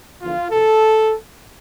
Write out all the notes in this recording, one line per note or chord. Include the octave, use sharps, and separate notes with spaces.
E2 D3 F3 F4
E2 B2 A4